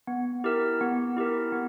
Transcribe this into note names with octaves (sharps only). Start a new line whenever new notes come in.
B3
E4 G4 A#4
B3
E4 G4 A#4
B3